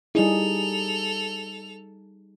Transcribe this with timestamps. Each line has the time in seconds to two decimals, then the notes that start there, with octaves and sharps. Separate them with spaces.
0.15 G3 D#4 E4 G#4 A4 F7